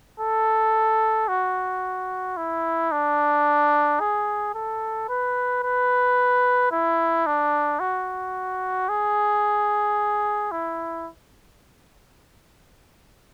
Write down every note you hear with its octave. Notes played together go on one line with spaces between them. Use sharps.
A4
F#4
E4
D4
G#4
A4
B4
B4
E4
D4
F#4
G#4
E4